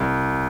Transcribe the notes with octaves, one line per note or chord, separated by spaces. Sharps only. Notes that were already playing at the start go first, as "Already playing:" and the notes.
Already playing: C2